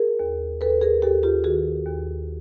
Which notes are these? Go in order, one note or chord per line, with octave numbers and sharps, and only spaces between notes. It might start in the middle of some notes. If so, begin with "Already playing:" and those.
Already playing: G#4 A#4
D#2
D#2 A4 B4
G#4 A#4
D#2 G4 A4
F4 G4
D#3 F#4 G#4
D#2